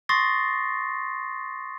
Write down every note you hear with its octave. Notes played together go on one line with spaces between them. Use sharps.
C6 C#6 D#6 A6 A#6 C7